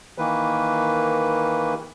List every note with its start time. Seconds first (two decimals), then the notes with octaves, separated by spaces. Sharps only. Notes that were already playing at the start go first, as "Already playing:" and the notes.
0.18 D#3 E3 A#3 B4